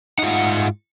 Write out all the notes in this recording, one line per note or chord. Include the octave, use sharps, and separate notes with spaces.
G#2 D#4 F4 F#5